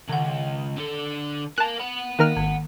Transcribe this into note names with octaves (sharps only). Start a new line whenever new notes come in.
C#2 D#3 F#5
D3 A4
A#4 F5 G#5 A5 F#6
F#5 B5
D#3 A#3 A#4 F6
G#1 D#3